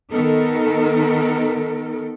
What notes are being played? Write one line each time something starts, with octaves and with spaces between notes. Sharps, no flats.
D#3 B3 D#4 A4 A#4